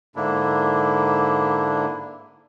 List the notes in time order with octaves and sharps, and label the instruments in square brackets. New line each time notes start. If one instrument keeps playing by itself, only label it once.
[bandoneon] G#2 D3 A#3 D4 E4